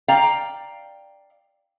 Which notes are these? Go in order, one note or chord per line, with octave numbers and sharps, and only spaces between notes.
D5 F5 G5 A#5